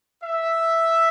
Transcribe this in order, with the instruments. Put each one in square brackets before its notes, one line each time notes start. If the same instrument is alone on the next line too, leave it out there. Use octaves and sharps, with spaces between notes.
[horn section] E5